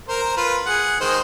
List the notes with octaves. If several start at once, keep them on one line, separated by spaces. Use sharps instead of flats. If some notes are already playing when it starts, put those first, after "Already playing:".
A#4 C5
F4 B4
G#4 F#5
D#3 G#3 C5